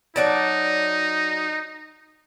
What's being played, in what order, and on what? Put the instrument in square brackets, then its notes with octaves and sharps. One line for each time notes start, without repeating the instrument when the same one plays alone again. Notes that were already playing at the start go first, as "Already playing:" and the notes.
[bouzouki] F#3 D5 A5 [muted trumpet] D#4